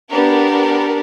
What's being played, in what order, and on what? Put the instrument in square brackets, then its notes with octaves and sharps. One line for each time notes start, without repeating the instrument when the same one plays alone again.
[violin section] B3 D4 G4 A#4